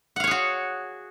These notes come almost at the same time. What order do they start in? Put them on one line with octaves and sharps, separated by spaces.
F#5 F5 C#5 G#4 F#4